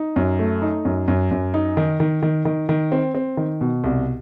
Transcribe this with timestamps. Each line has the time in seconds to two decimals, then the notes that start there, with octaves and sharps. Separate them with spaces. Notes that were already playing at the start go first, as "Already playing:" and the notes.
Already playing: D#4
0.16 F#2
0.39 A3
0.62 D#4
0.85 F#2
1.08 F#2
1.31 F#2
1.54 D#4
1.77 D#3
2.00 D#3
2.23 D#3
2.45 D#3
2.69 D#3
2.92 C4
3.15 C4
3.37 D#3
3.61 B2
3.84 C2